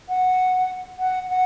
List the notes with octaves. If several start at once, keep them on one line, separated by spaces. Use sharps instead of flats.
F#5
F#5
F#5